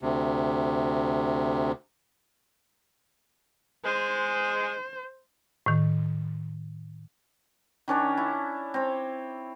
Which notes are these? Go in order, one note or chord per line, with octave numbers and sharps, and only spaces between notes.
D2 C3
G#3 C5
A2 D#3
D#3 C#4 D4 C#5
E4
C4 C#5